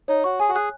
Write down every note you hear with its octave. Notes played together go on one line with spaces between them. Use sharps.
D#4 C#5
F#4 C#6
G#4 G#5
F#4
G#4 F#6